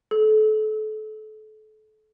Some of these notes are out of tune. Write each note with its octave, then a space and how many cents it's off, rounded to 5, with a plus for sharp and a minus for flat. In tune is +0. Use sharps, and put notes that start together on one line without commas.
A4 -30